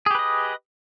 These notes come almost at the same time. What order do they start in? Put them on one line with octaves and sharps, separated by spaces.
G#4 G4 B4 D#5